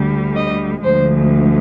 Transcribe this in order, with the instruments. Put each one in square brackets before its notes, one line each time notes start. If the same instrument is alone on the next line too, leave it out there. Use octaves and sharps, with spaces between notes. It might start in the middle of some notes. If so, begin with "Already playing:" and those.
Already playing: [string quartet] D2 D3 G3
D#5
D2 D3 F3 G#3 C5